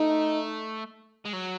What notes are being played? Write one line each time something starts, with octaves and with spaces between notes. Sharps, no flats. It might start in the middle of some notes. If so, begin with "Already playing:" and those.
Already playing: A3 D#4
G#3
F#3